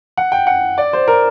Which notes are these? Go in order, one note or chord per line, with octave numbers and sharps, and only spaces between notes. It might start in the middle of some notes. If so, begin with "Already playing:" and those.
F#5
G5
F#5
D5
C5
A#4